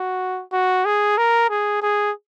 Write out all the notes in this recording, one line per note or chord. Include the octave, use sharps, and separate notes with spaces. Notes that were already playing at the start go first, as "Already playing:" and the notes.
Already playing: F#4
F#4
G#4
A#4
G#4
G#4